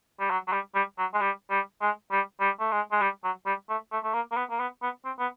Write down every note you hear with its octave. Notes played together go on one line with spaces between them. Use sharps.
G3
F#3
F#3
G3
G3
F#3
G#3
G3
G3
G#3
G3
G3
A3
G#3
G#3
G3
F#3
G3
A3
A3
A3
A#3
A#3
B3
A#3
B3
B3
C4
B3